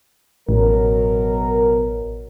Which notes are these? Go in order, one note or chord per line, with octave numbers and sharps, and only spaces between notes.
A1 B2 F#3 A#4